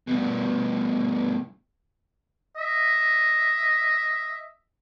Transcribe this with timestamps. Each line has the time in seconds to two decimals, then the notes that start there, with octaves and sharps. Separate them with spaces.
0.07 G2 B2
2.57 D#5 E5